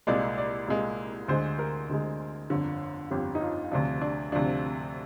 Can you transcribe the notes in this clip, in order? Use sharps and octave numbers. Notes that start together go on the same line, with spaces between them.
C2 A#2 G#3 D5
D5
C2 A#2 G#3
D2 D3 G#3 C5
A#4
D2 D3 G#3
G1 F2 D3
G1 F2 D3 G4
D#4
F4
D2 C3 F3 D4
D4
D2 C3 F3 D4